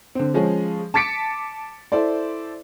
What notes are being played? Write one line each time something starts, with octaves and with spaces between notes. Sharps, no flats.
D3 C4
F3 G#3 C#4 G#4
A5 D6 A6 B6 C#7 D7
E4 A4 C5 D5